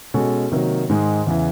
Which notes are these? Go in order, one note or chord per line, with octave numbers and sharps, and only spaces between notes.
B2 G#3 C#4 F#4 A4
C3 D#3 F#3 A#3
G#2 D#3 G#3
E2 C#3 E3